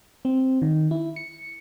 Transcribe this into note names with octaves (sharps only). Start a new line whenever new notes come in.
C4
D#3
E4
C#7